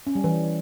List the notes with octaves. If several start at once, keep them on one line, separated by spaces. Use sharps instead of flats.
C#4
G3
E3